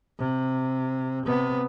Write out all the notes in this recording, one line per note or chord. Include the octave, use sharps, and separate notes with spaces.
C3
C3 B3